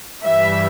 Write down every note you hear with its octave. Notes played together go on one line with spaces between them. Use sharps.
G2 E3 G3 E5